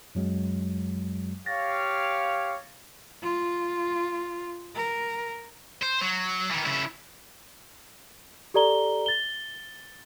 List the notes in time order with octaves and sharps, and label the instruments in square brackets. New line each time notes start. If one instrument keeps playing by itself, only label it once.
[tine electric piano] F#2 F#3 G#3
[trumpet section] G4 C#5 F5 [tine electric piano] A6 A#6
[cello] F4
A#4
[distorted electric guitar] C5
F#3
D#3 E3
C#3 E4
[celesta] G4 A4 D5 A#5 G7
A6 G7